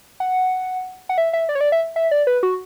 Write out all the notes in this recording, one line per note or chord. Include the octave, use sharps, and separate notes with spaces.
F#5
F#5
E5
E5
D5
C#5
D5
E5
E5
D5
B4
F#4